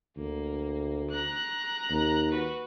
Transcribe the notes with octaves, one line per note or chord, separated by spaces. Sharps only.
D2 A#3
A#5 F#6
D#2
F#4 B4